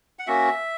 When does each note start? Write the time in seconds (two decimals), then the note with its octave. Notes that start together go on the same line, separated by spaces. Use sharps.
0.19 F#5
0.27 A#3 C#4 F#4 E5